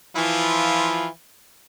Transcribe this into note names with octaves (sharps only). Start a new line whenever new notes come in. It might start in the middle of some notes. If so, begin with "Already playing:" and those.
E3 F3 E4 F4